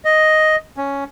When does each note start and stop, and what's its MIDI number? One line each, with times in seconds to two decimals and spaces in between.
0.05 0.56 75
0.77 1.04 61